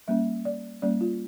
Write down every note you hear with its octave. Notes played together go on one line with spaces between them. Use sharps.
G3 A#3 C#4 E5
D5
G3 A#3 C#4 D5
F4